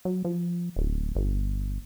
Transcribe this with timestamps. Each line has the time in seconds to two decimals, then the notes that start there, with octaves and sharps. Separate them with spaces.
0.05 F#3
0.25 F3
0.76 D1
1.15 G1